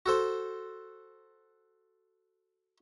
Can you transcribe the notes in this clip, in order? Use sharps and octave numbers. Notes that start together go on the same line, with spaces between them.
F#4 A4 C5